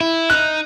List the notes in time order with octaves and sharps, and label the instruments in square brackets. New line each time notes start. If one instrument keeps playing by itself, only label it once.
[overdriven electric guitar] E4
[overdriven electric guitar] D#4 [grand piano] F#6